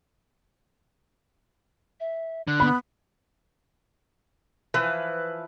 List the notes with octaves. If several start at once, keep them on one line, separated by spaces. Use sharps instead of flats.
E5
D3 F#6
B3 B5
E3 F3 B4